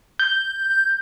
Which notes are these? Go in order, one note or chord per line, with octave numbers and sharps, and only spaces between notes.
G6